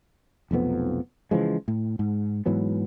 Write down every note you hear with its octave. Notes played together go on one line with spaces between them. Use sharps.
F1 B1 F2 B3
C#3 E3 F3 G#3
A2
G#2
G#2 E3 F#3 B3